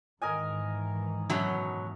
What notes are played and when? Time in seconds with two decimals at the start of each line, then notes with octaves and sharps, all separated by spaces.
0.22 G#2 D#3 E3 A#4 D#5 G#5
1.30 F#2 B2 F#3